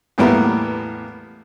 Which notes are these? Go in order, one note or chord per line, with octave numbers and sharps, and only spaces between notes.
E2 A2 G3 A#3 B3